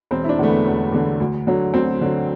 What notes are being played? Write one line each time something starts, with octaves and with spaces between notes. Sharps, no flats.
E1 C4
E4
D4
E2 D3 A3
B3
E1
E2 D3
D2
D3 F#3
D2 C4
D3 F#3